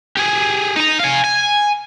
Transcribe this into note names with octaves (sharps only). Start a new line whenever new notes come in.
G4 G#4
D#4 A#5
F5 G#5
G#5